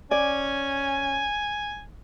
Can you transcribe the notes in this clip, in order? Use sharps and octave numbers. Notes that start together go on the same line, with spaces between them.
C#4 D5 G#5